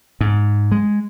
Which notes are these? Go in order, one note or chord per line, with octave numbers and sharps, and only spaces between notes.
G#2
G#3